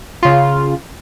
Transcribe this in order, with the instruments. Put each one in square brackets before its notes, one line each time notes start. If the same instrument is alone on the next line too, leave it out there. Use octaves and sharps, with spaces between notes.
[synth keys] C#3 F4